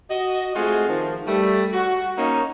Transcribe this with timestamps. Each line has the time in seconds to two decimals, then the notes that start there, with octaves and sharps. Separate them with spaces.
0.10 F#4 D#5
0.55 G#3 A3 C4 F4 F#4 G#4
0.87 D#3 F3
1.27 G3 A3
1.73 F#4
2.16 A#3 C#4 D#4